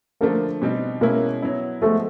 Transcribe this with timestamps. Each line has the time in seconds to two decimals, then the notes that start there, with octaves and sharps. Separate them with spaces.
0.21 D3 F3 A3 A#3 D4 A#4
0.62 B2 G3 C4 D#4
1.01 B2 G#3 A#3 C#4 E4 A#4
1.42 F#3 B3 E4
1.82 F3 G#3 A3 B3 A4